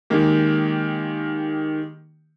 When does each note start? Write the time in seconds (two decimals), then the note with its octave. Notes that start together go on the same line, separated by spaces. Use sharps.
0.10 D#3 G#3 A#3 G4